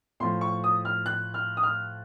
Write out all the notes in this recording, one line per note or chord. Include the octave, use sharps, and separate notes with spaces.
A2 F3 C6
C#6
D#6
F6
F#6
F6
D#6
F6